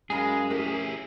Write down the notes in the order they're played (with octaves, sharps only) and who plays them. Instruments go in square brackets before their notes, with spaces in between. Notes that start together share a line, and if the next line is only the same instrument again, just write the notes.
[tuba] F#2 [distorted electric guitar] G#3 [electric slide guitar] G#4 [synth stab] F5 A#5 B5
[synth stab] A3 G4 A#4 [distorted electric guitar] C#4 E4